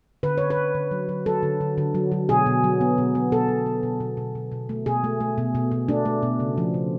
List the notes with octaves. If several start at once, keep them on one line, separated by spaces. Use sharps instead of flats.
D3 B4
D3 C#5
B4
D3
D3
F#3
F#3
F#3 A4
D3
D3
D3
F#3
F#3
B2 G#4
B2
F#3
B3
B2
B3
B2 A4
F#3
B3
B2
B2
B2
B2
B2
A3
B2 G#4
A3
A3
B2
B2
B2
A3 D4
A3
B2
C#3
F3
C#3